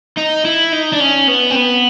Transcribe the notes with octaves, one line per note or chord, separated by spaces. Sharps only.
D#4
E4
D#4
D4
C#4
B3
C4
B3